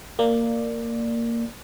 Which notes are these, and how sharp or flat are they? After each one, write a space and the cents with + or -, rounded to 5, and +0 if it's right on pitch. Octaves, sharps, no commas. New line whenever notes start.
A#3 -10 D5 +5